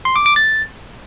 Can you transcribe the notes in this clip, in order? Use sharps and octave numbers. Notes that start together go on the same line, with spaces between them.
C6
D6
D6
A6